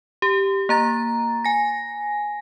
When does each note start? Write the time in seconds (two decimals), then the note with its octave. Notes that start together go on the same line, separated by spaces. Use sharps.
0.22 G4
0.69 A#3 A#5 A6
1.44 G#5 A#6